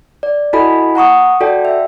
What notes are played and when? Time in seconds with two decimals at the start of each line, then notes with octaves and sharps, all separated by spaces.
0.23 D5
0.53 E4 F#4 A4 D#5 G#5 B5
0.95 F#5 A#5 C#6 D#6
1.40 F#4 A4 D5 G5
1.65 E5